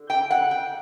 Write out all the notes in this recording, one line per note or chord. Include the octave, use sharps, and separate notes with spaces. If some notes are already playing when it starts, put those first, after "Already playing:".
Already playing: D3
G5
F#5
G5